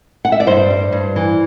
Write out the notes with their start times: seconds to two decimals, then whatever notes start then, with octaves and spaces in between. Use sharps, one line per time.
0.25 F#5
0.32 E5
0.40 D5
0.47 G2 C5
0.70 G3
0.92 G2
1.16 E3